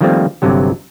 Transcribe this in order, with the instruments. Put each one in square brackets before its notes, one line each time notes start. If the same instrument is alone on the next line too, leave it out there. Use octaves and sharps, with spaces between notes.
[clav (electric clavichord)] D#3 F3 G3 A3 A#3 C4
G1 G2 C3 F#3 G4